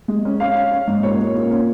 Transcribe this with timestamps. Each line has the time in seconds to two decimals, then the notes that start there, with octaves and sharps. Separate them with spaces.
0.08 G#3
0.25 C#4
0.40 C#4 F5
0.56 C#4
0.71 C#4
0.88 G#2
1.03 A#2 C#5
1.20 A#2
1.35 A#2
1.51 C#4